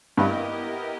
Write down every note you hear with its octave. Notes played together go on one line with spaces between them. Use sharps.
G2 B3 E4 G4 A#4 D#5